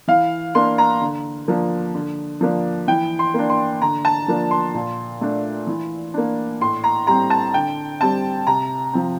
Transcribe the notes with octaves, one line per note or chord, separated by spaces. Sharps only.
E3 F5
A#3 D4 C6
A#5
D3
F3 A#3 D4
D3
F3 A#3 D4
E3 G5
C6
A#3 D4
C6
D3 A#5
A5
F3 A#3 D4
C6
A#2
A3 D4
E3
A#3 D4
A2 C6
A#5
G3 C4 A#5
A5
D3 G5
G3 C4 A5
C3 A#5
F3 C4